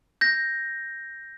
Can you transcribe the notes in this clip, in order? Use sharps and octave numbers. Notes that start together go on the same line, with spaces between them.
G6 A#6